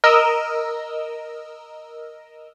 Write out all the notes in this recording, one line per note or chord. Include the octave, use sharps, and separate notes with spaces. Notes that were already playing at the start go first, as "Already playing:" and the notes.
A#4 D#5 E6